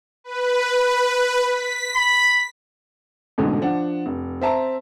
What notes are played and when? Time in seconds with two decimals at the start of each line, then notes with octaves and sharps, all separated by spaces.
0.24 B4
1.45 B6
1.96 B5
3.38 A1 G#2 B2 D3
3.61 F3 D4 F#5
4.06 F1
4.41 C4 E5 A5 A#5